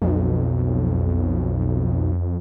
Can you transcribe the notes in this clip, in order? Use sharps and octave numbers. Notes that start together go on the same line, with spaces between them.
B1 F2